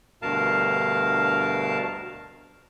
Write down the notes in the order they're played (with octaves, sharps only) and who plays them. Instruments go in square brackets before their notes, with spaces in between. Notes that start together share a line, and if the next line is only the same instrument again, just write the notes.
[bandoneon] D2 G2 B2 A#4 F5 A5